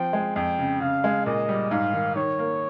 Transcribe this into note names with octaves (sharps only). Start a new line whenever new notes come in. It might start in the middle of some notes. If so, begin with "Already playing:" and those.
Already playing: F3 C4 G5
G#3
F2 G5
C#3
C#3 F5
G#3
A#2 D#5
G3
G#2 F5
D#3
D#3 C#5
A#3